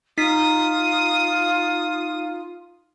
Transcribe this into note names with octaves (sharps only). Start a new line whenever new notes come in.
D#4 F4 D#6 B6